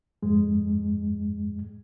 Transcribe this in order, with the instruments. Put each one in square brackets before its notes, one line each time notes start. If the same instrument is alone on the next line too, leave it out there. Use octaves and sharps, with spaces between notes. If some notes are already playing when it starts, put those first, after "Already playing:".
[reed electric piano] F2 G#2 G#3